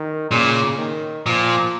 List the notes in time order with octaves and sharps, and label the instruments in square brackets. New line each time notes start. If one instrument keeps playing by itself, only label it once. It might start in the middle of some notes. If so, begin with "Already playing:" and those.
Already playing: [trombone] D#3
[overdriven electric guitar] A#2 [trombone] C#3
[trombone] D#3
[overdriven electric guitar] A#2 [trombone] F3